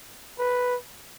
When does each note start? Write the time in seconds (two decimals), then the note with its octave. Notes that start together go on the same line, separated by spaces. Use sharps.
0.39 B4